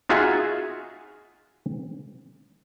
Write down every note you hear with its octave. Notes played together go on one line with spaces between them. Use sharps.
D#4 F4 F#4 G#4 E5 G#5